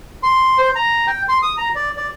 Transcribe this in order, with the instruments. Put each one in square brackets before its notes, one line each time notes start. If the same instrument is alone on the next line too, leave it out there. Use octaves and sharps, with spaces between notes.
[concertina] C6
C5
A#5
G5
C6
D#6
A#5
D5
D5